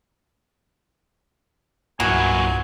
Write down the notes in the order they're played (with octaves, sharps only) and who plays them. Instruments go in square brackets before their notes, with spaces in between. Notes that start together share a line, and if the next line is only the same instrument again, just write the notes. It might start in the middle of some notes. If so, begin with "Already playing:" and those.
[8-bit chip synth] C2 G2 [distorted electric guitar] A#2 F#3 [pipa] E3 A#3 F#4 [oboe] G#5